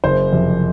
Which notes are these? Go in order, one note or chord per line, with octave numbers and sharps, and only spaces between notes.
F#1 C5
F2 C3